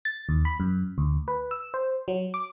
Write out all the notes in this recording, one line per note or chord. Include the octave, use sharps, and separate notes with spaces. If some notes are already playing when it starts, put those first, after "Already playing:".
A6
D#2
B5
F#2
D2
B4
E6
C5
F#3
D6